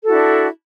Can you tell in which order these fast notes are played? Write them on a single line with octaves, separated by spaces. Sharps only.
A4 F#4 E4 D4